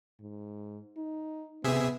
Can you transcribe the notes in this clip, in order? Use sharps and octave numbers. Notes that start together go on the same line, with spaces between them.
G#2
D#4
C3 B3 G#4 E5